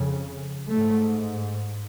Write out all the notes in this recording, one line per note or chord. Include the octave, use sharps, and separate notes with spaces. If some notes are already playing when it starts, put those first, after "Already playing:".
Already playing: F2 C#3
G#2 A3